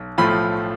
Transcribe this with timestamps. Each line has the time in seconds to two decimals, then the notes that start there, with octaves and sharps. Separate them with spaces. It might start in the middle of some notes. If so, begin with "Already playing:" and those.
Already playing: B1
0.18 A2 F3 A3 F4 B5